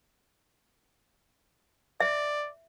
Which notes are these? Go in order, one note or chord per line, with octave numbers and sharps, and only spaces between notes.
D5 E5